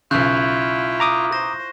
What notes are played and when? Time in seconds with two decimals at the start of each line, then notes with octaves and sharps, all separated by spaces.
0.11 B1 C#3 E4 F4 C#6 F#6 G6
1.00 A#5 D6 D#6
1.32 C5 A#6